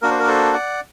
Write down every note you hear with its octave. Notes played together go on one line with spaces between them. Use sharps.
A#3 D4 F#4 A#4
C5
A#4
A4 C5
D5 F#5